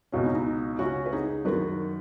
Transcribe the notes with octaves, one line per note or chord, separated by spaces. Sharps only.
C#2 B2 C#4 F#4
D#4
D#4
C#2 C#3 C#4 F#4
B4
D#4 G#4
F#2 D#3 F#4 B4